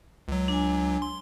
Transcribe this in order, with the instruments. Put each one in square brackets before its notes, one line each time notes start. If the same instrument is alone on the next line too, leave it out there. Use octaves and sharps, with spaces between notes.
[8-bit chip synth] C#2 F#3
[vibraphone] D4 G#5
[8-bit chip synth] C6